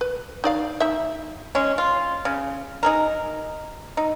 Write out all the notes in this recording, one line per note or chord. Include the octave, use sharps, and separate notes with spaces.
B4
D#4 D5 F5
D#4 E5
G#3 C#4
F4
C#3
D#4 G#4 A#4
D#4